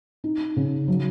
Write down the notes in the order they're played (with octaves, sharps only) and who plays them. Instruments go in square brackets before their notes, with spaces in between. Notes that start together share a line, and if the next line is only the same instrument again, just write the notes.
[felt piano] D#4
C#3
F#3